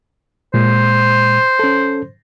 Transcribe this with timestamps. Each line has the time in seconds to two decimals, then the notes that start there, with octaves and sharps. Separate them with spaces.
0.54 A#2 G#3 C5
1.59 C#4 A4